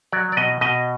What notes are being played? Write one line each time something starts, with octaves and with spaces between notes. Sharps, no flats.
F#3 D5
D5
B2 D#5
B2 D#5